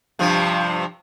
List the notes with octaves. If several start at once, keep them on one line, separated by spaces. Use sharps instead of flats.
G2 C3 F3